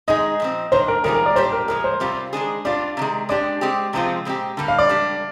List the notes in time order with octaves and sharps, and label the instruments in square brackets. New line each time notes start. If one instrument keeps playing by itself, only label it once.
[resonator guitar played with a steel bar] D#3 G#3 D#4 G#4 [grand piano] D#5
[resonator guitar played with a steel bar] A#2 F3 C4
[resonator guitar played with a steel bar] D#3 A#3 D4 [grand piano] C5
[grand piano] A#4
[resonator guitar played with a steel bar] D#3 G3 A#3 F4 G#4 [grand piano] A#4
[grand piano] A#4
D5
[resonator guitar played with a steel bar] A#2 G3 D4 G4 [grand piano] C5
[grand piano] A#4
[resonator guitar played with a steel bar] A#2 F3 G#3 [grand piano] A#4
[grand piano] C5
[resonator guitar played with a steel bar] C3 G3 C4 F4
D#3 G#3 D4 G#4
[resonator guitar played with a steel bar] G3 D4 F4 [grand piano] D5
[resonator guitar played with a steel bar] C3 D#3 G#3
[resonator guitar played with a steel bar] G#3 D4 G4 [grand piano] D5
[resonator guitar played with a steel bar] G#3 C4 G4
C3 F3 G#3 C4 F4
A#2 G#3 C4 G4
D3 G3 A#3
[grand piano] F5
D5
[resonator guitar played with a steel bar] G3 D4 G4